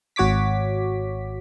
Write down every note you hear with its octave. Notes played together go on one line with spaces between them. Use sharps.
G#1 F#4 C#5 D6 B6